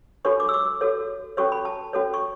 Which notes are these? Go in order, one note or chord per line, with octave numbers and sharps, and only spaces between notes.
D4 F#4 A4 C#5 C#6
D6
E6
D6
F#4 A4 C#5
C#4 F#4 A4 C#5 C#6
B5
A5
C#4 F#4 A4 C#5
C#6